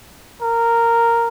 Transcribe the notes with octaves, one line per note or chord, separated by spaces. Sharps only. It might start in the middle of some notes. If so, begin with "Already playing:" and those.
A#4